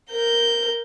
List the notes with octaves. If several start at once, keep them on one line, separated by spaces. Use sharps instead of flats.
A#4 G6